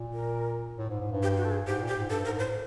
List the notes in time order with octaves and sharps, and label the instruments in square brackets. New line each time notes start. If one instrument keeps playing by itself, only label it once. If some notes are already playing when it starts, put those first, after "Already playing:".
Already playing: [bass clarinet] A#2
[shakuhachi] A#4
[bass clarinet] A2
G#2
G#2
G2
[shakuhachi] G4
F#4
A4
G#4
[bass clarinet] G#2 [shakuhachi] G4
[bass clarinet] A#2
[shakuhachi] G4
[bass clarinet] G#2
[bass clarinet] G2 [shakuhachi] A4
[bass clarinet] G#2 [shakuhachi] A#4
[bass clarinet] A2 [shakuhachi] C5